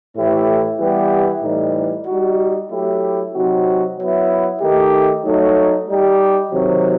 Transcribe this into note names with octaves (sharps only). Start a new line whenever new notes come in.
A2 E3 A3 E4 G4
E3 G3 B3 E4 G4
A2 E3 G3 D#4
G3 D#4 F#4
F#3 A3 E4 G4
C3 F#3 C4 D#4 F#4
F#3 B3 E4
D#3 A3 D#4 G4
F#3 A3 D#4
G3 D#4 G4
C3 D#3 F#3